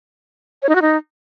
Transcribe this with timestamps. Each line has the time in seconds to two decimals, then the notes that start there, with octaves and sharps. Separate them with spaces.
0.63 C#5
0.69 D#4
0.75 F#4
0.82 D#4